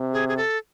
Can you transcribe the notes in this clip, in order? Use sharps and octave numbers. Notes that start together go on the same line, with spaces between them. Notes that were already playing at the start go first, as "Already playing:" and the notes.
Already playing: C3
G#4
G#4
A4